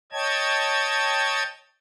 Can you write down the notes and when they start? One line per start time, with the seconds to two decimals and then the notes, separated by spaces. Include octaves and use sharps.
0.12 C#5 D#5 G5 A5 G#6